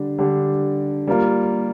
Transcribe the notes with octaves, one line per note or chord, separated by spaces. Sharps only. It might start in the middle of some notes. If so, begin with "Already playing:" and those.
Already playing: D3 G3 D4 G4
D3 G3 D4 G4
G3 A#3 F4 A#4